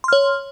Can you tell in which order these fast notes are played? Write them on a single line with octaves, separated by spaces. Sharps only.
C6 F6 C#5